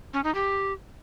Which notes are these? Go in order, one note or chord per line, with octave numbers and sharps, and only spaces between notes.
C#4
D#4
G4